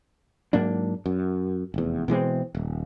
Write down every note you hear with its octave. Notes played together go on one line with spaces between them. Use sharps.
G#2 F#3 A#3 D4
F#2
F1 E2
B2 E3 G#3 C4
D#1